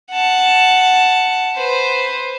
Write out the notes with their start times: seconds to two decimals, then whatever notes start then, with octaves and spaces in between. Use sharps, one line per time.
0.11 F#5 A5
1.55 B4 C5